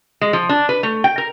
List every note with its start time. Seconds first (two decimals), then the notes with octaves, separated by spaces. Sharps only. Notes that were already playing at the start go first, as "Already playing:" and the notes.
0.21 G#3
0.33 F3
0.49 D4
0.69 B4
0.83 A3
1.04 G5
1.18 A#4